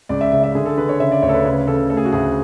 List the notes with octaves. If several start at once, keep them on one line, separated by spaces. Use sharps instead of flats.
C#2 D5
E5
C#3 E5
E5
D3 G#4
A4
D3 B4
C#5
C#3 E5
D5
D2 C#5
A4
B4
C#3 B4
C#3 A4
A3 A4
G#4
F#4
D2 G#4